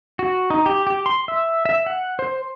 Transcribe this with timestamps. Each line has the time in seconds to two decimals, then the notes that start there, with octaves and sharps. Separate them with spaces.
0.19 F#4
0.50 D#4
0.66 G4
0.87 G4
1.06 C6
1.28 E5
1.65 E5
1.86 F#5
2.19 C5